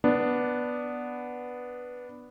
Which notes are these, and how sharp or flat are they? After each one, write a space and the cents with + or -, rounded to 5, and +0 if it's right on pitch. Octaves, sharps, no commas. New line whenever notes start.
B3 +0 D4 +0